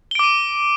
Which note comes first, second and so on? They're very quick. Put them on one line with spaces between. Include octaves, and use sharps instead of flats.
G7 D7 D6 D#7